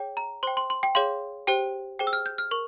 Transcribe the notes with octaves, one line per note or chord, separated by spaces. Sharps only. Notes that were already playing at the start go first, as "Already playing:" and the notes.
Already playing: G#4 C#5 G5
A#5
C5 G5 C6
C6
C6
G5
G#4 C#5 F5 C6
G4 C5 G5
G#4 C5 G5
E6
F6
G6
F6
A#4 C#6